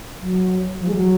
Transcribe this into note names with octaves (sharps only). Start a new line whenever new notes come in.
F#3
F3
G#3
F#3